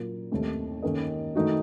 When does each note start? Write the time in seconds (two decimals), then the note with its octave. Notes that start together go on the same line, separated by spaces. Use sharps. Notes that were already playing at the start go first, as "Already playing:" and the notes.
Already playing: A#2 F#3 A#3 F4
0.32 D#2 D#3 A3 C4
0.83 D#3 A#3 C#4 A4 D#5
1.35 D#3 A3 D#4 F#4